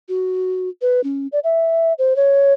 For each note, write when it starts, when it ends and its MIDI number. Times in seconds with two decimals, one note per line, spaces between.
0.09 0.69 66
0.82 1.03 71
1.04 1.27 61
1.32 1.39 74
1.44 1.93 76
1.98 2.16 72
2.16 2.53 73